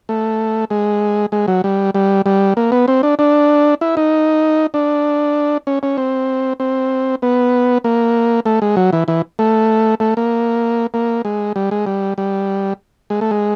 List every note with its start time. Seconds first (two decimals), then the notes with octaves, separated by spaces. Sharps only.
0.09 A3
0.70 G#3
1.32 G#3
1.48 F#3
1.64 G3
1.95 G3
2.26 G3
2.57 A#3
2.72 B3
2.88 C4
3.03 D4
3.19 D4
3.81 E4
3.97 D#4
4.74 D4
5.67 C#4
5.83 C#4
5.98 C4
6.60 C4
7.22 B3
7.84 A#3
8.46 A3
8.62 G#3
8.77 F#3
8.93 E3
9.08 E3
9.39 A3
10.00 A3
10.17 A#3
10.94 A#3
11.25 G#3
11.56 G3
11.71 G#3
11.86 G3
12.18 G3
13.10 G#3
13.21 A3
13.31 G#3